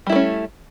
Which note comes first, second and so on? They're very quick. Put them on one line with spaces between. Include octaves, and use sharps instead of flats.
G3 E4 A3 C#4